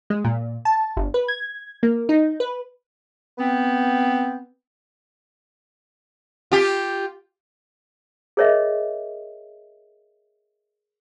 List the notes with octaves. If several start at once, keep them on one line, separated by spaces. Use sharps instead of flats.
G#3
A#2
A5
G1
B4
G#6
A#3
D#4
B4
B3 C4
F4 G4
G#4 A#4 C#5 D#5 E5